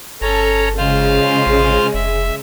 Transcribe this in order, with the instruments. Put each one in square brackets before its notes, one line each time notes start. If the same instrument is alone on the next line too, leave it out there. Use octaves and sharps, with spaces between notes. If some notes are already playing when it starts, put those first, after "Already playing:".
[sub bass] G1 [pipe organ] C#4 C#5 A#5 [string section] A4
[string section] C#3 G#3 [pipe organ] F4 C5 F5
[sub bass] A1
[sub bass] F1 [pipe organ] E5